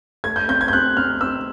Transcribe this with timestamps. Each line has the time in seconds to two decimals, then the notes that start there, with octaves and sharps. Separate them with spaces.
0.24 A3 G#6
0.36 G6
0.48 C4 G6
0.61 G#6
0.68 G6
0.73 C4 F#6
0.97 C4 F6
1.21 C4 E6